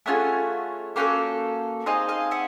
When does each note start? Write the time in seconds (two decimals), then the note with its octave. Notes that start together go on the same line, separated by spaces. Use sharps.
0.06 A3 C#4 F4 G#4 E5 F#5
0.96 A#3 C#4 F#4 A4 F5 G5
1.86 C4 D#4 G#4 D#5 F5
2.09 D#5 F5
2.31 E5 F#5